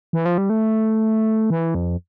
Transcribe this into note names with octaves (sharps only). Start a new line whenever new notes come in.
E3
F3
G3
A3
E3
F2